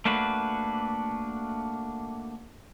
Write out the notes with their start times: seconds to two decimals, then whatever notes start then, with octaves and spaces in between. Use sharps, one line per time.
0.05 A3 A#3 D4 F#4 B4